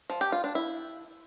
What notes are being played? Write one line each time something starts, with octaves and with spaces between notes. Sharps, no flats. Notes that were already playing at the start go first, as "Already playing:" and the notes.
F3
G4
F4
D4
E4